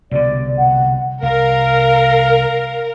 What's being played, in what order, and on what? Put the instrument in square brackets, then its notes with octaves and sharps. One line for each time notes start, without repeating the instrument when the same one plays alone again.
[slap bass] C2 B2 D3 [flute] D5
[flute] F#5
[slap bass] C2 [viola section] A#4 [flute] F5